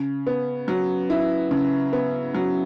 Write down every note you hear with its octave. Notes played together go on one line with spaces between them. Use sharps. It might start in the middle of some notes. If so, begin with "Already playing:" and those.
Already playing: C#3
B3
F#3
E4
C#3
B3
F#3